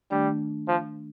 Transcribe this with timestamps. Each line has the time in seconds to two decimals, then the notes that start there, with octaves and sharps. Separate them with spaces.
0.11 D#3 G3 A3 D4
0.68 F3